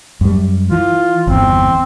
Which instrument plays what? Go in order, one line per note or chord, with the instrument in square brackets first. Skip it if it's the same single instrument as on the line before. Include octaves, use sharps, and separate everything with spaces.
[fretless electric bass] F#2 G3
[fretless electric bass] E3 [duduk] F4
[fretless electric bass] G1 E2 [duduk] C4